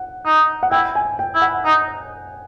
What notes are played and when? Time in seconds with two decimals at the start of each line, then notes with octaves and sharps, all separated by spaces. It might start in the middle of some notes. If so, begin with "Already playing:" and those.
Already playing: F#5
0.25 D#4
0.63 F#5
0.71 E4 G5
0.95 G#5
1.19 G5
1.35 E4
1.42 F#5
1.65 D#4